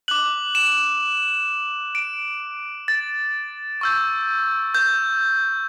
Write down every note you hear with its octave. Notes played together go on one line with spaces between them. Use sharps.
D6 F#6 F#7
E7
D7
A6
C#6 E6 G6
G6